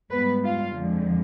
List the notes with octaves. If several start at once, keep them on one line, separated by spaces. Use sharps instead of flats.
G#2 G3 B3 B4
F4 F5
F2 D3 F3 G#3